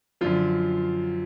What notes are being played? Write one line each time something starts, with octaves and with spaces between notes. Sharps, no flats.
F#2 D3 F3 F4